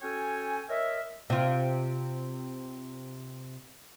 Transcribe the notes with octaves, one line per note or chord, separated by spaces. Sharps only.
C#4 F#4 A4 C#5 G5 G#5
A#4 C#5 D#5 E5
C3 F4